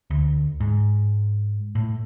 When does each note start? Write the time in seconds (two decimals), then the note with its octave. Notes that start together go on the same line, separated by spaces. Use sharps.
0.10 D2
0.60 G#2
1.75 A2